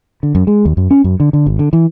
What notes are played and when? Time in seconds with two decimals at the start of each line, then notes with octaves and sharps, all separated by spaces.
0.23 D3
0.35 F#2
0.47 G#3
0.65 D#2
0.77 F#2
0.91 C#4
1.04 F#2
1.20 D3
1.33 D3
1.46 G#1
1.59 D3
1.73 E3